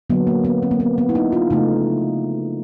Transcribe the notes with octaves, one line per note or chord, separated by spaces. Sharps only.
D3 F#3 A#3 B3
A#3
B3
C4
A#3
B3
B3
E4
D#4
F4
C#3 F3 A3 D#4